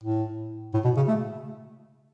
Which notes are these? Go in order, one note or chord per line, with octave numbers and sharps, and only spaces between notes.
A2
A2
B2
C#3
A3